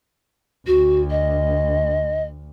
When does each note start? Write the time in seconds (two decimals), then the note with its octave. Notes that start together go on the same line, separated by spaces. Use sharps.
0.66 D2 F#4
1.10 D#5